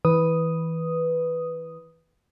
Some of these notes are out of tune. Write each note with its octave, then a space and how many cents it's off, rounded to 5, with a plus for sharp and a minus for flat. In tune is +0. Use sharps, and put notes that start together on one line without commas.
E3 -25 B4 +0 D#6 +0